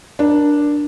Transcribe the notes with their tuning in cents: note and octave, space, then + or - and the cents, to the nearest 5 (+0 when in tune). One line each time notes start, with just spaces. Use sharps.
D4 +0 A#4 +20